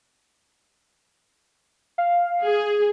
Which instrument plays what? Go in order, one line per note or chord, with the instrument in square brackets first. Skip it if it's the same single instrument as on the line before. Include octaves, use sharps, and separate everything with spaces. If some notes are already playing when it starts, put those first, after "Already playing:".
[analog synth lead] F5
[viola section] G#4